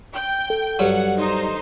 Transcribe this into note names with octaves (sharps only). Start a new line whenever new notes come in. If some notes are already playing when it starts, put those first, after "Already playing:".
G5 G6
A4
G2 F#3 F#5
D#4 C5